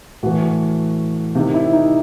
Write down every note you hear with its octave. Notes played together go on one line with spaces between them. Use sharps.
A2 E3 F#4
C3 D#3
E4
D#4